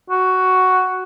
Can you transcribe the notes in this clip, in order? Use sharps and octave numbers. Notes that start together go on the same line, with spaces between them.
F#4